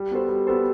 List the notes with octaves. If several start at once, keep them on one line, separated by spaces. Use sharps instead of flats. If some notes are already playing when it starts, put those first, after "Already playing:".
Already playing: G3
B3 F#4 A4 C5
G3
B3 F#4 A4 C5